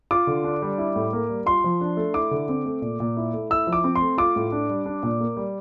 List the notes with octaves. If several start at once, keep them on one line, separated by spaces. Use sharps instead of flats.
F4 D6
D3
D4
G3
E4
A2
A#3
G3
F4 C6
F3
D4
A3
E4 D6
D3
C4
A3
A#2
A#2
E4
A3
E4 E6
F3
D6
C4
C6
A3
F4 D6
A2
D4
G3
D4
A#2
A#3
G3